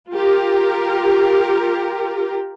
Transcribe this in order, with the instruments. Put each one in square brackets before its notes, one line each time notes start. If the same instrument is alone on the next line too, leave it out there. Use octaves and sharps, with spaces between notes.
[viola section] F4 G4 A#4